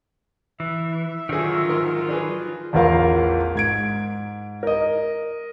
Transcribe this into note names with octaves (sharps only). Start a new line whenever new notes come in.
E3 E5
D3 D#3 F3 F#3 F4 G#4
G#2 A#4 C6
D4 G#4 B4
A1 E2 F4 A#4 F5
G#2 G#6 D7
A#4 D#5